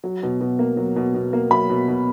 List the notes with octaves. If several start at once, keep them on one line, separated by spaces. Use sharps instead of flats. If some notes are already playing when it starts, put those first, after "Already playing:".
F#3
B2
B2
A#3
F#3
B2
B2
A#3
F#3 B5
B2
B2